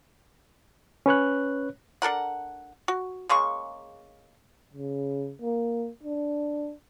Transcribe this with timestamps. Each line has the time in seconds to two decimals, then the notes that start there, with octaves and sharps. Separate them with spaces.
1.06 C#4 B4 C#5 F#6
2.02 D4 A4 A#4 F#5
2.88 F#4
3.29 C#3 G#3 A#3 C#6
4.74 C#3
5.42 A#3
6.03 D4